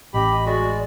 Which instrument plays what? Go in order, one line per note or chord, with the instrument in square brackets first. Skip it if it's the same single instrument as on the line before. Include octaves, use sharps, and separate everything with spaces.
[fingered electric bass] A1 [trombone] G4 [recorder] D#5 [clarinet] B5
[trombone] G#3 [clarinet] F#4 [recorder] D5